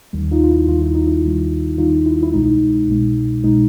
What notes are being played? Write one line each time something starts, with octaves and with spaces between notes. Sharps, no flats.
D#2 D#3 G3
D#4 F4
F4
E4
D#2 D#3 G3 F4
E4
D#4
E4
D#2 D#3 G3
D#2 D#3 G3 D#4 F4
E4
E4
C2 B2 G#3 D#4
C2 B2 G#3
C2 B2 G#3 D#4